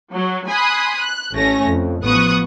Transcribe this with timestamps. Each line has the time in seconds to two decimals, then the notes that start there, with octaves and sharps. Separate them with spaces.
0.11 F#3
0.48 G#5 B5 C6 D#6 F#6
1.00 F#6
1.33 A1 A3 C#4 A#6
1.66 F2
2.03 A1 F3 B3 C#6 D#6 F#6